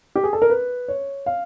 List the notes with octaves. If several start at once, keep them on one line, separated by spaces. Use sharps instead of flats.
G4
G#4
A4
A#4
B4
C#5
F5